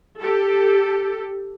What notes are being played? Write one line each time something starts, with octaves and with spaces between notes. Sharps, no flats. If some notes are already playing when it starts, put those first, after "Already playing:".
G4 A4